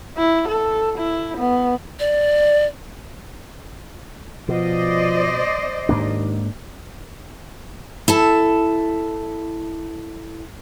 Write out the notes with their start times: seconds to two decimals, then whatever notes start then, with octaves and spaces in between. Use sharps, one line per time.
0.17 E4
0.48 A4
0.98 E4
1.37 B3
1.99 D5
4.49 B2 F3 C5 D5 D#5
5.89 D#2 G#2 A#3 D4
8.08 E4 A4 A5